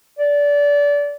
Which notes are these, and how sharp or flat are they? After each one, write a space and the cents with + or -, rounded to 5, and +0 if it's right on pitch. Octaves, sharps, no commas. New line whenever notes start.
D5 -25